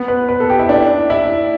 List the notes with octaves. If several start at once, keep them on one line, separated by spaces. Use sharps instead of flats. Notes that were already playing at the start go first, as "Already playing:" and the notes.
Already playing: B3
B4
B4
A4
G4
E4
D4
E4